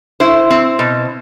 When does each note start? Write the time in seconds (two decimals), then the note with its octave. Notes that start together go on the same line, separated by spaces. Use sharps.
0.20 E4 C5
0.51 C4
0.79 B2